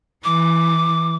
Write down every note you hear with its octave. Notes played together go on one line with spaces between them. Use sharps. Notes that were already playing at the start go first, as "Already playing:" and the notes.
E3 D6